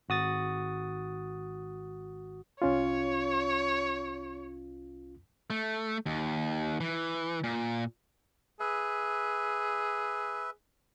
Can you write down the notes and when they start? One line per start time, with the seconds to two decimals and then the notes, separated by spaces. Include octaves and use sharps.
0.09 G#1 F#4 D#6 A6
2.62 C2 C#4 F4 C#5
5.50 A3
6.06 D#2
6.80 E3
7.44 A#2
8.60 G#4 B4 E5